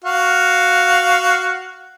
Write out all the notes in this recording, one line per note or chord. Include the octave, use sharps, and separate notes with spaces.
F#4 F5